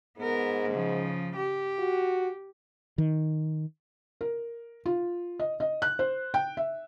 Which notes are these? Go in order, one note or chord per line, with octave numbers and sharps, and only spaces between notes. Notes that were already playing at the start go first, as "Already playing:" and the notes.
G#2 B3 A#4
C#3 F3
G4
F#4
D#3
A#4
F4
D#5
D#5
F#6
C5
G5
E5